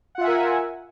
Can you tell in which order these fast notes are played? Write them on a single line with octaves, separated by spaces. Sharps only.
F#5 F4 E5 G#5 A#4